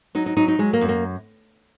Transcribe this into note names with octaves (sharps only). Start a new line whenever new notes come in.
F#3 D#4
D#4
F#3 D#4
D#4
F#3 G#3
A#3
F#2
A#3